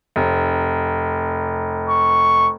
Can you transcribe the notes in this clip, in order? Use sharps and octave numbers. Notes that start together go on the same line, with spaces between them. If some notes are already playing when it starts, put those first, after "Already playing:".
F1
C#6